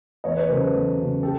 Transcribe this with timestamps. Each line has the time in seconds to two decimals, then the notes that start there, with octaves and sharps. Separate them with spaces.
0.24 E2 C#5 D#5
0.37 B4 C#5
0.49 C#3 F#3 A#4 C5
0.61 A4 B4
0.74 E2
0.98 C#3 F#3
1.22 G4 A4